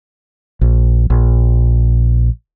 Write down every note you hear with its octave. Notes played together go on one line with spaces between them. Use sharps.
A#1
A#1